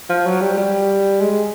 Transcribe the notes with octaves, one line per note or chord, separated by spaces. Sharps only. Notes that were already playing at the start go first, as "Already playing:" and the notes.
F3
F#3
G3
G3
G#3